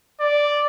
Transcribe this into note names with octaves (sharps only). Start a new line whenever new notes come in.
D5